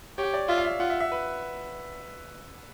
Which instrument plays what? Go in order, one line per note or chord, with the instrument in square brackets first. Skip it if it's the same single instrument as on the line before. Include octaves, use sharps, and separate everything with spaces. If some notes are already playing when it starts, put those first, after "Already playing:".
[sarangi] G4 [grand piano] C#5
[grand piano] D5
[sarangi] F4 [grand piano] E5
[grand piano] F5
E5
[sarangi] F4 [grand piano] F#5
[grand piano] E5
E5
B4